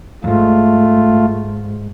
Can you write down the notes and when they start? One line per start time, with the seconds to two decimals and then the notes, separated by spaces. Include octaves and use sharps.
0.24 F2 G#2 A3 F4